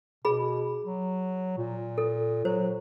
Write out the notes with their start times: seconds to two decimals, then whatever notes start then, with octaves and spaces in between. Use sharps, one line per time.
0.25 B2 G#4 B5
0.84 F#3
1.58 A#2
1.98 A4
2.45 F#3 C5